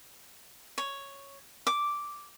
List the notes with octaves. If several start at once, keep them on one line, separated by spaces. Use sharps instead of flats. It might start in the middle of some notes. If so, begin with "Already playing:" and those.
C#5
D6